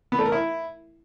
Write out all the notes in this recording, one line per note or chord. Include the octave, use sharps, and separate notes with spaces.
B3
A3
A#4
E4